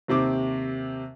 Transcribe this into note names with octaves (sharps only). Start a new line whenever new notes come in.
D#2 C3 C4 D6